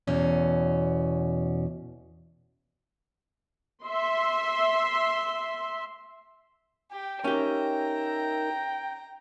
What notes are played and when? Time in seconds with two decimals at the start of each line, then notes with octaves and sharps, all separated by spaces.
0.07 E2 B2 C#4
3.85 E5 C6
6.92 G4 G5
7.24 C#4 D#4 G4 A#4 E5 A#5